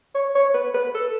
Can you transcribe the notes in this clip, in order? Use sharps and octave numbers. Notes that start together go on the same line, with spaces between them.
C#5
C#5
B4
B4
A4